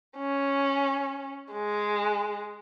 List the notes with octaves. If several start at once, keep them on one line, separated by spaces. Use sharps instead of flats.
C#4
G#3